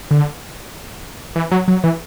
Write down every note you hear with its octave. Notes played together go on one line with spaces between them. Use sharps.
D3
E3
F#3
F#3
E3